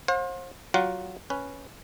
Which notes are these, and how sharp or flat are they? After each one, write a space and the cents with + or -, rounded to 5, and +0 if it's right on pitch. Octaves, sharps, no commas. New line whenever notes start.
C5 +35 F5 +45
F#3 +20 F4 +25 F#5 +15
C#4 +0 B4 +0